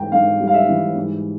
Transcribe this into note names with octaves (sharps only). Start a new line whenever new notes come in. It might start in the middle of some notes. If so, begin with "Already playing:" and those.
Already playing: G#2 E3 G3 G5 A#5
G#2 F5
G3
F5
E5
E3
G#2